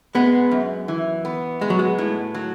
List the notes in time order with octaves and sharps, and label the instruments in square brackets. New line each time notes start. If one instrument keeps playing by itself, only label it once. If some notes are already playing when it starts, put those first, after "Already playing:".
[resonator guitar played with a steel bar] G#3 [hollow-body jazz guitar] B3
[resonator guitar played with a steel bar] F#2
E3
B3
[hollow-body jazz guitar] G#3 [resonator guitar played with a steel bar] B3
[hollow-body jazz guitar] F#3
G#3
[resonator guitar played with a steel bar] A2
F#3